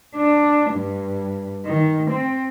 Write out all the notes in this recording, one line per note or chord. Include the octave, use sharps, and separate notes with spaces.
D4
G2
D#3
C4